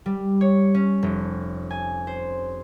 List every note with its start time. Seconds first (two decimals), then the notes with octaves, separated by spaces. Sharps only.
0.06 G3
0.41 C#5
0.75 C#4
1.03 F1
1.71 G#5
2.07 C5